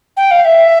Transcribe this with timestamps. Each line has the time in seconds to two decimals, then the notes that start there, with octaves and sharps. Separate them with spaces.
0.17 G5
0.31 F5
0.45 E5